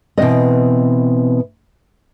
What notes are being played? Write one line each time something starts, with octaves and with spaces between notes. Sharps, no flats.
B2 E3 C4 D#5